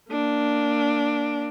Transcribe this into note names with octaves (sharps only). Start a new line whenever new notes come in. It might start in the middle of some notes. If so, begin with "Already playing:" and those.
A#3 D4